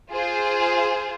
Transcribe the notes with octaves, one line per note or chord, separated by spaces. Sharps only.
F4 G#4 C5